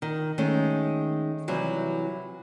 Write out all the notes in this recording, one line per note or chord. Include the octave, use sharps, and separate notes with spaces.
D#3
D#3 G#3 A3 C#4
C3 E3 F#3 G3